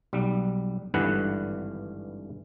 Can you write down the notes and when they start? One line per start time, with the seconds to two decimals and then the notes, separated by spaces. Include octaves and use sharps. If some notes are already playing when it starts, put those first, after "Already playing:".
0.13 B1 G3
0.94 G#1 G2 D3 E3 B4 F#5